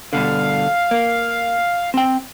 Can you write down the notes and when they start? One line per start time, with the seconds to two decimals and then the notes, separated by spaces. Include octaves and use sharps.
0.13 G2 B2 D3 F5
0.91 A#3
1.94 C4 G5